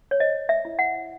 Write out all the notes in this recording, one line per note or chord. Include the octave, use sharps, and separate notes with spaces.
C#5
C5 D#5
E5
E4
F#5